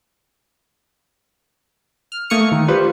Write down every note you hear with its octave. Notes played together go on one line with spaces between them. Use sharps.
F6
A3 A#3 C#6 D#6 F6 C#7
D#3
G3 F4 B4 C5